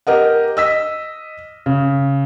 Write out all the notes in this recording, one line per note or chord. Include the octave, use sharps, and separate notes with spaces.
G4 A#4 D#5 F#5
D#5 E6 B6
C#3